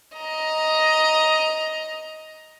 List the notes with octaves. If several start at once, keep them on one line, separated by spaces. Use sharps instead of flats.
D#5 A#5